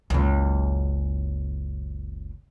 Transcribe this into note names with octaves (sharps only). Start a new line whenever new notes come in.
F#1 C#2